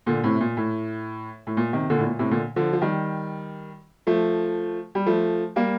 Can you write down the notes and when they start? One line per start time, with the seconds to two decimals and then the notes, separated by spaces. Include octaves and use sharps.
0.06 A#2 D3
0.24 A2 C3
0.40 A#2
0.57 A2
1.47 A2
1.57 A#2
1.73 C3 D#3
1.90 A#2 D3
1.98 A2
2.06 A#2
2.19 A2 C3
2.31 A#2 D3
2.56 D3 F3
2.73 F3
2.82 D#3 G3
4.07 F3 A3
4.95 G3
5.06 F3 A3
5.56 G3 A#3